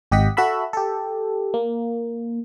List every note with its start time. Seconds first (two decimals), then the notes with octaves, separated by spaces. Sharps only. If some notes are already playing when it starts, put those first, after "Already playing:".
0.11 G#1 G4 D#5 F#5 B6
0.37 F#4 A4 E5 B5
0.73 G4 A4
1.54 A#3